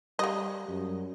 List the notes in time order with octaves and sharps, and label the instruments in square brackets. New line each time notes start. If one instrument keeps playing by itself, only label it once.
[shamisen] C#3 D#5 [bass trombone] G3
[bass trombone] F#2